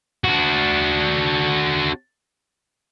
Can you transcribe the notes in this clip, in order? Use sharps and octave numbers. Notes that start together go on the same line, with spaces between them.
D4 F#4